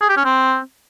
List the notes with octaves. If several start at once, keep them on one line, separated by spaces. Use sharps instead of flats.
G#4
G4
C#4
C4